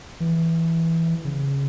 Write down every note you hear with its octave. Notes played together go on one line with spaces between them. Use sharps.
E3
C#3